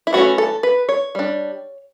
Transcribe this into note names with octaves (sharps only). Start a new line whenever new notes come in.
E4
E3 A3 C#4 F#4
A4
B4
C#5
G3 D4